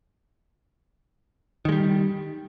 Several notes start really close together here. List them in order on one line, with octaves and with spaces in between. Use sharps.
D#3 G#3 G3